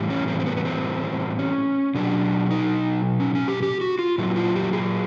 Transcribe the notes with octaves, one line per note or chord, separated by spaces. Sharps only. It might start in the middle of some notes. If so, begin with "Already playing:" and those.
Already playing: A2 E3 G3
C#4
C4
C4
B3
B3
C4
C#4
B2 F#3 D4
D#4
C#4
C#4
G4
G4
F#4
F4
A#2 F#3 E4
F4
G4
G#4